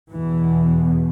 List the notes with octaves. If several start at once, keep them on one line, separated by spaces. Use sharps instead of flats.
E2 B2 E3